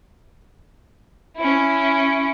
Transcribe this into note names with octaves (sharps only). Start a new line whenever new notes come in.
C#4 E4